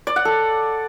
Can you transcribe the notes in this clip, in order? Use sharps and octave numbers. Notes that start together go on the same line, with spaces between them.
D5
F#5
A4